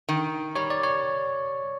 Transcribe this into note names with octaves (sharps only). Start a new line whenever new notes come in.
D#3
G3 C#5
D5
C#5